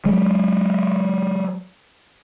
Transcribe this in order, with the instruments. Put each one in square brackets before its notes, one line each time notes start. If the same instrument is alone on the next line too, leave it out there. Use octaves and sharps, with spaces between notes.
[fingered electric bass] F#3 G#3